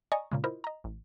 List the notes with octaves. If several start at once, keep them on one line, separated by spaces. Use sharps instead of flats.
D5 D#5 G#5 A#5 C#6 D#6
A#2 C#3 G#3
E4 F4 A#4 C5 D#5
D#5 A#5
A1